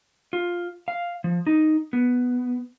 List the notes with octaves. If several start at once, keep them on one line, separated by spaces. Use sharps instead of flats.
F4
F5
F3
D#4
B3